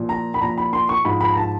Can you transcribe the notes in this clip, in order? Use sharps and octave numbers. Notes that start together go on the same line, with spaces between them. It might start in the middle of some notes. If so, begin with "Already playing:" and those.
Already playing: A#2 F3
A#5
B5
A#2 F3 A#5
B5
C6
C#6
G#2 F3 B5
B5
A#5
A5